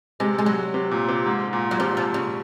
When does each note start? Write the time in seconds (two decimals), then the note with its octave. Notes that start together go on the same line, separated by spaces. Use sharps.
0.20 C3 G#3
0.38 G#3
0.46 F#3
0.74 C3
0.91 A#2
1.08 C3
1.26 G#2
1.53 A#2
1.71 F#3
1.79 C3 F3
1.97 F3
2.14 C#3